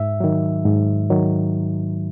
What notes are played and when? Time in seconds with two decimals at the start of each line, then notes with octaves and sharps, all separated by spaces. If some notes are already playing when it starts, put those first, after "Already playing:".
Already playing: G#2 E5
0.20 D#3 F#3
0.65 G#2
1.10 D#3 F#3